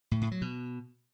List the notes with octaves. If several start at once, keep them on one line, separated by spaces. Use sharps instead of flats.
A2
A2
F#3
B2